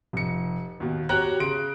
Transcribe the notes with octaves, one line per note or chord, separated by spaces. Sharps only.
F1 C#7
D#2 B2
F#4 G4 C#5 G5 A#5 F#6
C#3 C6 D7